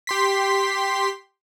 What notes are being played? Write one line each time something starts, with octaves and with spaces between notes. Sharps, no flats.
G4 C6 B6